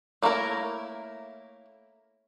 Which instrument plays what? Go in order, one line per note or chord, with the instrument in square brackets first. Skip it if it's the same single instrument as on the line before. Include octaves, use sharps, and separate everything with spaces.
[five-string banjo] A3 A#3 C#4 E4 A#4